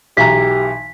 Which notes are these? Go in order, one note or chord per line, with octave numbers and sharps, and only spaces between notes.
B1 E3 G4 A#5 B6